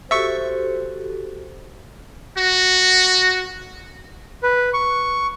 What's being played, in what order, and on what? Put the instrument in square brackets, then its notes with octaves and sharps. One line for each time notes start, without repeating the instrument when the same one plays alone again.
[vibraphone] F#4 G4 A4 [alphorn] C5 [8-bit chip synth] E5 C#6
[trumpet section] F#4
[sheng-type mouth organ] B4
C#6